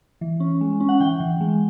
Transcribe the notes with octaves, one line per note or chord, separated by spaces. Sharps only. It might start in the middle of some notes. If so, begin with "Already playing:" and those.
E3
C#4
G#3
C#4
F#5
E3 G5
E3
G#3